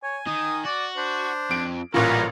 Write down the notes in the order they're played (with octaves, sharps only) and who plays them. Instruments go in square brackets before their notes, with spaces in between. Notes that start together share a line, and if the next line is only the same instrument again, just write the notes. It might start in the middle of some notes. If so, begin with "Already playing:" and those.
[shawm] C#5 [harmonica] G#5
[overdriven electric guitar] D#3 [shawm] D#6
[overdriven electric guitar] F#4 [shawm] D5
[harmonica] D4 [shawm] C5
[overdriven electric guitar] F2 [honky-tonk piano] D7
[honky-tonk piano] A1 A#2 [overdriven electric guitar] E3 G3 [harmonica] C#4 F#4 B4 [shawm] A#4